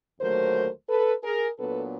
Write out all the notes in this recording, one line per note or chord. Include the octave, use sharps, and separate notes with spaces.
D#2 D3 F#3 A3 A#4 C5
A4 B4
G#4 A#4
A#2 F#3 B3 D4 A4 B4